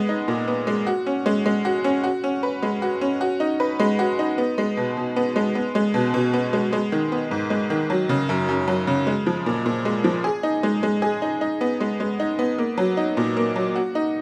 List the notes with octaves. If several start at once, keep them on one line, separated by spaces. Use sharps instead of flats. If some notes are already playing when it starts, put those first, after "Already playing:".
Already playing: G#3 B3
D#4
A#2
B3
G#3
F#4
C#4
G#3
G#3
F#4
C#4
F#4
C#4
B4
G#3
F#4
C#4
F#4
D#4
B4
G#3
F#4
D#4
B3
G#3
B2
B2
B3
G#3
B3
G#3
B2
B2
B3
G#3
G#3
D#3
B3
G#2
G#3
D#3
F#3
C#3
F#2
F#2
F#3
C#3
G#3
F3
A#2
A#2
G#3
F3
G#4
D#4
G#3
G#3
G#4
D#4
D#4
B3
G#3
G#3
D#4
B3
A#3
F#3
D#4
A#2
A#3
F#3
F#4
D#4